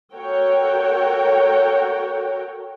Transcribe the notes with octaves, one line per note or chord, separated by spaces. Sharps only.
F#4 A4 A#4 C#5 F#5 G5